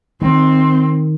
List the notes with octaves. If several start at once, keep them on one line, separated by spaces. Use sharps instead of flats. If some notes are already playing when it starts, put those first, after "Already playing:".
D#3 C4